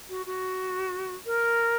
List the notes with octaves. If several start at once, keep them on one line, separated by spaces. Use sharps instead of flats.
F#4
F#4
A#4